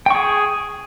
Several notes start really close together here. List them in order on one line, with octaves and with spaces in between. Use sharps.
G5 C#6 G#4